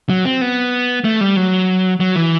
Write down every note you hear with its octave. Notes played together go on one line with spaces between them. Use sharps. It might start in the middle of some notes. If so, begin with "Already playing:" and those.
F#3
C4
B3
A3
G3
F#3
F#3
E3